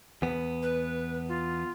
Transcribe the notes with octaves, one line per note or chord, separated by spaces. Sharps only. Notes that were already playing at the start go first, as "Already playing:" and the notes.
E2 B3
B4
F4